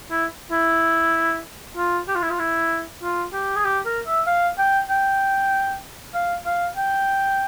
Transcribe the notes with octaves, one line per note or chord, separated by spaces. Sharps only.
E4
E4
F4
G4
F4
E4
F4
E4
F4
G4
G#4
G4
A#4
E5
F5
G5
G5
F5
F5
G5